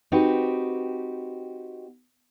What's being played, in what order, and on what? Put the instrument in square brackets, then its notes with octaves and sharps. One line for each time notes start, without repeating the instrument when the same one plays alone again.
[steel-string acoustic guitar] C4 D#4 F#4 G4 B4